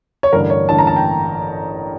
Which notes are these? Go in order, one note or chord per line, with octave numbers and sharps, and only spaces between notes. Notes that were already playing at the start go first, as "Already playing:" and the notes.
C#5
A1 G2 D3 A#4
C#5
A1 G2 D3 A5
A#5
A5
G5